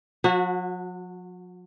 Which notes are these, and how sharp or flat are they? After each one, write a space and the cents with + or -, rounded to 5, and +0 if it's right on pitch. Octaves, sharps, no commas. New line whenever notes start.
F#3 -45 F#4 -15